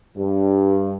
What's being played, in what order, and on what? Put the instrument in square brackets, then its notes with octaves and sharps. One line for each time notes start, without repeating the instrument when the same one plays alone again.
[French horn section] G2